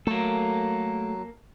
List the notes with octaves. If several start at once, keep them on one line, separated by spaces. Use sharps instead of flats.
F#3 A3 A#3 A4